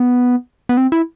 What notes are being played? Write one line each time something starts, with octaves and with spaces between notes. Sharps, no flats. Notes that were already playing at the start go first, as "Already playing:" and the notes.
Already playing: B3
B3
C4
E4